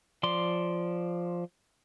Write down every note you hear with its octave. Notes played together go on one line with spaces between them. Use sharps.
F3 D5 C6